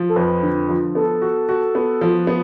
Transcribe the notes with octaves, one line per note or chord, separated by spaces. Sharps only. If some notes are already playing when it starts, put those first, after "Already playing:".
Already playing: F3
A4
F2 B4
D3
F3
B3 A4
F#4
F#4
B3
F3
B3